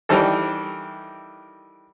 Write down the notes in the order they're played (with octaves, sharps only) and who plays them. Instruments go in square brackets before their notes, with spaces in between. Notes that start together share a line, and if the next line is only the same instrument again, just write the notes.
[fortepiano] D#3 E3 G3 D4 A4